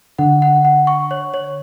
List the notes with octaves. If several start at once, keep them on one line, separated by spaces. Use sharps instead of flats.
D3 F#5
F#5
F#5
C#6
C#5
C#5